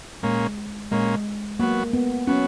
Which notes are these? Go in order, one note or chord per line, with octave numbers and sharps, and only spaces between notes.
A#2 G#3 A#3 C#4
A#2 G#3 A#3 C#4
F#3 A#3 B3 F#4
B3
F#3 B3 C#4 F#4